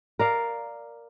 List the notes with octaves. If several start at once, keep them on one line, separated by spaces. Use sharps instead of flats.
A#4 D5 F5